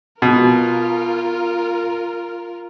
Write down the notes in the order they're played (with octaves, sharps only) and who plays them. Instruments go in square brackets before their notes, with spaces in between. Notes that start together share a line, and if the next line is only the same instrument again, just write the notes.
[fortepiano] B2 [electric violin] F4 A#4